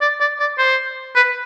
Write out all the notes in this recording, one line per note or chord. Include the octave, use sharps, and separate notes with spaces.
D5
D5
D5
C5
B4